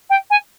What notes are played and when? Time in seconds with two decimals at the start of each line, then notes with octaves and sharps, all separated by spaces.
0.09 G5
0.30 G#5